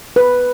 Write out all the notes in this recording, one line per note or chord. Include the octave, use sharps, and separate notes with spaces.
B4